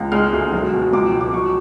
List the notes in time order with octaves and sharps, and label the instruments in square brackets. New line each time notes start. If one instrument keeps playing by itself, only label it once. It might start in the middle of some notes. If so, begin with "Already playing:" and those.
Already playing: [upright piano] C#2
G#3 F6
D2
B1
B2
C#2 D6
B2
D6
F#3 C#6